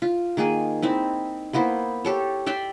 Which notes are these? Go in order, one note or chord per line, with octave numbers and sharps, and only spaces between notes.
F4
D#3 A#3 G#4 G#5
C4 D#4 E4
A#3 B3 E4 C5
G4 A4 C#5
D5 E5 G5 C6